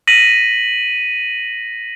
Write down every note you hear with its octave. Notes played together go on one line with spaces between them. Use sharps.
A#6 B6 D#7 F#7